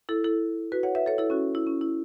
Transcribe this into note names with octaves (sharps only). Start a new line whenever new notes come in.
E4 A4
E4 A4
F#4 B4
C#5 F#5
B4 E5
A4 C#5
E4 A4
C#4 F#4
E4
C#4
E4